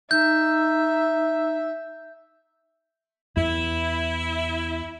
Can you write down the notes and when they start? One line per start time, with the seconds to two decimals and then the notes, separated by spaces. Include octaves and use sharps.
0.11 D#4 E5 G6
3.37 E2 E4